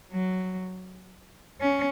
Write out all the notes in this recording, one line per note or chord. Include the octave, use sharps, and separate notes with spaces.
F#3
C#4